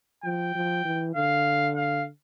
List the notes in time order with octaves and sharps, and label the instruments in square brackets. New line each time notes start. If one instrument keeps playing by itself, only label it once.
[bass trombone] F3 [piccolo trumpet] G5
[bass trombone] F3
E3
[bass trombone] D3 [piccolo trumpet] F5
[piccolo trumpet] F5